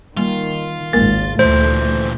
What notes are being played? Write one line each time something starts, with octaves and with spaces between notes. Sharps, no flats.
D#3 G3 A#3 F4
G#1 C#2 G#3 A#3 A#4 A6
D2 A#2 E3 A3 C5